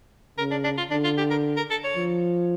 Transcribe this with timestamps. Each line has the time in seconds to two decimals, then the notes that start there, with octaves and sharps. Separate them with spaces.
0.38 C#3 A#4
0.51 D4
0.64 D4
0.78 F4
0.91 D3 D4
1.04 F4
1.18 G4
1.30 A#4
1.57 A#4
1.70 A4
1.84 C#5
1.97 F3